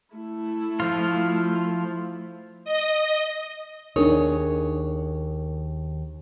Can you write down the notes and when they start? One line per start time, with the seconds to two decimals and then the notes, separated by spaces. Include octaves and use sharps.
0.15 A3 E4
0.80 F3 F4
2.65 D#5
3.96 D#2 D4 D#4 G#4 A#4 C#5